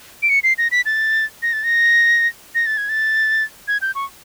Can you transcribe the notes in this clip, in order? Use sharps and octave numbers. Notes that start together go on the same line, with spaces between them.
D7
C#7
C7
A#6
B6
A6
A#6
A6
A#6
A#6
A6
G#6
A6
G#6
G6
C#6